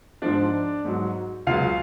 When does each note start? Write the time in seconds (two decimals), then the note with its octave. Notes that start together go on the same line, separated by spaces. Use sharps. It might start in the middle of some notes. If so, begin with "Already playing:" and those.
0.22 G#2 F3 D4 D5
0.85 G#2 F#3
1.47 C#2 C#3 F#3 F4 F5